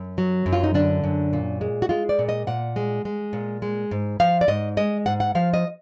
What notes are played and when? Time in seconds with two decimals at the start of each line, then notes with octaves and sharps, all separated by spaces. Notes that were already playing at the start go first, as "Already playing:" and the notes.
Already playing: F#2
0.18 F#3
0.46 F#2
0.53 F4
0.64 D#4
0.74 D3 D4
1.04 F#2
1.33 A#2
1.61 G#3
1.82 F#4
1.89 G#3 F4
2.09 D5
2.19 A#2
2.29 D#5
2.47 A#2 F#5
2.76 G#3
3.05 G#3
3.33 A#2
3.62 G#3
3.91 G#2
4.20 F3 F5
4.41 D5
4.48 G#2 D#5
4.77 G#3 D#5
5.06 G#2 F#5
5.20 F#5
5.35 F3 F5
5.54 D#5